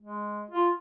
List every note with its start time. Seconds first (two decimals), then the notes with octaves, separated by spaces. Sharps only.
0.02 G#3
0.51 F4